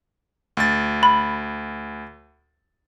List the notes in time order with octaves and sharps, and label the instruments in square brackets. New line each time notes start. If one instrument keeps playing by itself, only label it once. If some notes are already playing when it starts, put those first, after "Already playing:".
[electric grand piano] D2 A6
[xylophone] B5